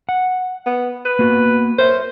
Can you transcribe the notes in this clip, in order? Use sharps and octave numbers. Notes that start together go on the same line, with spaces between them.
F#5
B3
B4
A#3 B3 F#4
A#4 C5 C#5 E5